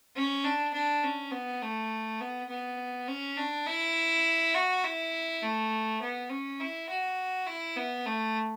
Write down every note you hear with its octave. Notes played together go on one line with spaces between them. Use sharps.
C#4
D4
D4
C#4
B3
A3
B3
B3
C#4
D4
E4
F#4
E4
A3
B3
C#4
E4
F#4
E4
B3
A3